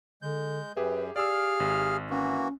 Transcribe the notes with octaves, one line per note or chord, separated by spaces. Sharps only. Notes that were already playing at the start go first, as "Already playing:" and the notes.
D3 G#3 G6
F#2 G4 G#4 B4 E5
G4 G#4 D5 F5 E6 F6
G#1
E3 A#3 C#4 F#4